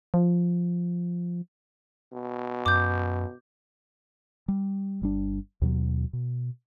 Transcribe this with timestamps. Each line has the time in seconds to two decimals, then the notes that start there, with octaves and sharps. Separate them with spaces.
0.14 F3
2.13 B2
2.66 F#2 D6 G6
4.48 G3
5.02 G1 G3 D4
5.62 D#2 B2 F#3
6.13 B2